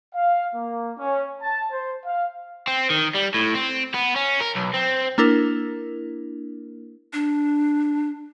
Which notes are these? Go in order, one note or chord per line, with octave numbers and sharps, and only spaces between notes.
F5
A#3
C#4
A5
C5
F5
C4
D#3
G3
A2
C4
B3
C#4
A#4
B1
C4
A#3 D4 E4 A#4
D4